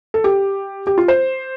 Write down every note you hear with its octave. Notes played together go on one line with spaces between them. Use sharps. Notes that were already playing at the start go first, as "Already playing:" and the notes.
A4
G4
G4
F4
C5